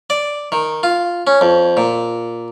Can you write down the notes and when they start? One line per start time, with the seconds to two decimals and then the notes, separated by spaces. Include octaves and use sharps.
0.10 D5
0.52 D#3
0.83 F4
1.27 C#4
1.41 F2
1.77 A#2